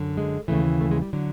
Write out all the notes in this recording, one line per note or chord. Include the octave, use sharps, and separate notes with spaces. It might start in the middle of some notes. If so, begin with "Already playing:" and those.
Already playing: F#2 D3
G#3
D#2 C#3 E3 A3
A3
G#3
G3
D3 F#3